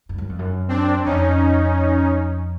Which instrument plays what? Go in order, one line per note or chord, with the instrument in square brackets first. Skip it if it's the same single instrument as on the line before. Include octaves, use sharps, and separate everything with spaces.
[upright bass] G2
F#2
F2
F#2
[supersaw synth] C4 D4
[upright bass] F2 [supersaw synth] C#4 D#4